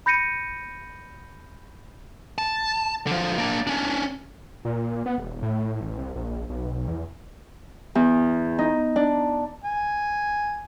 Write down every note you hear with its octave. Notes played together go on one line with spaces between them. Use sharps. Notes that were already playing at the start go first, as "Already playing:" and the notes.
B5 G6 A#6 C#7 D#7
A5
D3 F3
A#3 D4
C#4 D4
A#2
B3
E1
A2
A1
C2
A#1
B1
E2
E2
D#4
D4
G#5